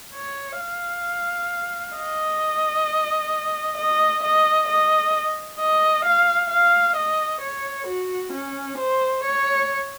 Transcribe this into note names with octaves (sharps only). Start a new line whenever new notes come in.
C#5
F5
D#5
D#5
D#5
D#5
D#5
F5
F5
D#5
C#5
F#4
C#4
C5
C#5